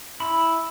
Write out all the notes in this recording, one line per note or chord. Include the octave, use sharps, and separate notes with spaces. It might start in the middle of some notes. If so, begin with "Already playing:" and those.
E4 B5